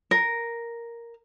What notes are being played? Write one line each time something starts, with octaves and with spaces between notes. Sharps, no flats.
A#4